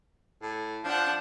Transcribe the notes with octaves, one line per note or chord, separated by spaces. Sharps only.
A2
F3 D4 F#5